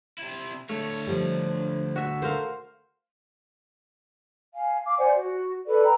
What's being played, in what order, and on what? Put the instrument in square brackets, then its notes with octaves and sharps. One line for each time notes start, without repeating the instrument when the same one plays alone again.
[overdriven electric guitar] C3 E4
[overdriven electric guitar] D2 C#5 [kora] A3
[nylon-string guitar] F3 G3
[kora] F#4 E5
[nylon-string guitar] F#4 A4 A#4 [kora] C5 F5
[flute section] F5 G#5
F5 D6
C5 D5 F#5 G#5
F#4
A4 B4 D5
G5 A#5